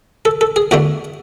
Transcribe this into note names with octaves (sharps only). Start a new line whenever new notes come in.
A4
A4
G#4
E2 D3 A3 D4 F#4